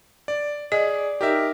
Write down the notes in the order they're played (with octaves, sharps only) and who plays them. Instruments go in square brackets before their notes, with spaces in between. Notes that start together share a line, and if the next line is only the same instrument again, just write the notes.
[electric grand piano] D5
[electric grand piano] G#4 [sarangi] D5 [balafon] D#5
[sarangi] D#4 [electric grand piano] G4 A#4 E5